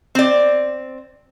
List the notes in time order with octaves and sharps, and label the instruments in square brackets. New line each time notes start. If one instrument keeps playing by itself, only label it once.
[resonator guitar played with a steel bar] C4 D5